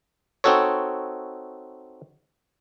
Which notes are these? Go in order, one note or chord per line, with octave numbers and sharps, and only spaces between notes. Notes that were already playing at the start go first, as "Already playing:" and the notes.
C4 D#4 F#4 A4 C#5